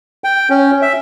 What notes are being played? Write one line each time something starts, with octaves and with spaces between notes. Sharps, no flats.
G5
C#4
E5